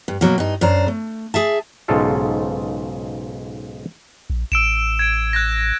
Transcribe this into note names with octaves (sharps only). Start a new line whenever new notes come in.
G2
B2 F#3 A#3
G2 D#4
F#2 D4 C5 A#5
A3
G#4 E5 A5
B1 G#2 C#3 F4 A4 F5
A#1
A1 E6 D7 E7
G#6 D7
F#6 G#6 A#6